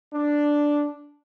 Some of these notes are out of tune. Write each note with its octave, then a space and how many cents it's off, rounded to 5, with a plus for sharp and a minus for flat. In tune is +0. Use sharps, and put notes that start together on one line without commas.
D4 +0